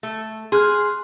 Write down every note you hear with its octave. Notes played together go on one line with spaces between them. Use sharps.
A3
G#4 C6 F6 F#6